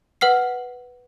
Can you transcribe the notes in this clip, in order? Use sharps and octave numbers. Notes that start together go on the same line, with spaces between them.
B4 F#5 F6 C7